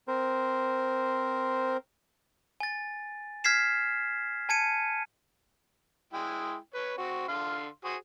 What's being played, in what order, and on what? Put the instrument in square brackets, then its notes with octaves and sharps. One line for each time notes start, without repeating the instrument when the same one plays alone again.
[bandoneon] C4 A#4 C5
[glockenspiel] G#5 A6
F6 G#6 B6 C7 E7
G#5 A5 G#6 C#7 D#7
[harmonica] G#3 E4 G5
B4 C#5
C4 F#4
D3 F5 C6
F#4 G#4 C5